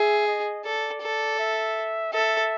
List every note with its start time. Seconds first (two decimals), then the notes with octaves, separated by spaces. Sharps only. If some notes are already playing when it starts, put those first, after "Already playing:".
Already playing: G#4 E5
0.28 D#5
0.65 A4 D5
1.02 A4
1.39 E5
2.13 A4 E5